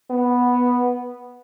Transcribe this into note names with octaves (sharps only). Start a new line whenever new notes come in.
B3